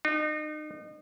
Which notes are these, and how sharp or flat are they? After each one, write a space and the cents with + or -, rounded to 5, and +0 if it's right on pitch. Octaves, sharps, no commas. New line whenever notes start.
D#4 -35